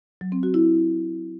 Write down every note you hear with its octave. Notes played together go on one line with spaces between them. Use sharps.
F#3
C4
F#4
E4